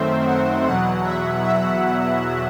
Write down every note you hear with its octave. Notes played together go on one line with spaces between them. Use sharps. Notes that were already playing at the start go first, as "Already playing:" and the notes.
Already playing: F#2 D#3 A3 C4 C5 E5
F#5
E2 B2 F#3 F#5
E5
E5